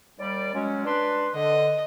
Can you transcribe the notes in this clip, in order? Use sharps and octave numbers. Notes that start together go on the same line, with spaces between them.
D#2 G3 D5
F#3 G#3 C#4
D4 B4 C6
D3 D#5